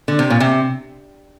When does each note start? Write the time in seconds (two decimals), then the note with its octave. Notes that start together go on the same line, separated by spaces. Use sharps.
0.08 D3
0.19 C3
0.30 A#2
0.40 C3